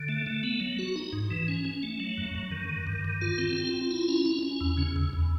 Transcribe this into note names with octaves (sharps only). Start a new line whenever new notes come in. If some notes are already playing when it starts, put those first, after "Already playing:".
Already playing: D3
A3
A3
B3
F#3
F#4
D#4
G#2
E3
C#4
C#4
A3
F#3
F#2
F#2
D#3
D#3
G2
D#3
F4
C4
F4
F4
E4
C#4
C#4
C#4
E2
C#3
E2
E2